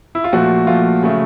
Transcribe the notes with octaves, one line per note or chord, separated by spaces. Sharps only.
E4
F4
A#2 F3 A3 F#4
A#2 F3 A3 F4
C#3 F#3 A3